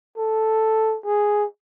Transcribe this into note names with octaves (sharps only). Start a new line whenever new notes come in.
A4
G#4